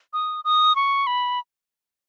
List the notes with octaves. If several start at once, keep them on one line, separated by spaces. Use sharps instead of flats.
D#6
D#6
C#6
B5